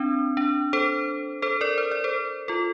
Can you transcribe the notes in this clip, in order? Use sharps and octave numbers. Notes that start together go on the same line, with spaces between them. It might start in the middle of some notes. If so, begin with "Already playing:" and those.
Already playing: C4 D4
D4
A4 C5
A4 C5
A#4 D5
C5
D5
A4 C5
F4 A4